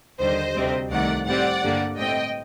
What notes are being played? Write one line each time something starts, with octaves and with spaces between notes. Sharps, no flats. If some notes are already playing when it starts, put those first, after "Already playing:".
D#2 D3 G3 C5 D#5
D2 C3 G3 C4
C2 C3 D#3 A3 D5 F#5
A2 G3 C4 D5 F#5
G2 D3 G3 A#3
A2 A3 C4 D#5 G5